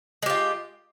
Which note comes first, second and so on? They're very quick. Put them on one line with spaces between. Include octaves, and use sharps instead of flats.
G#3 G4 F4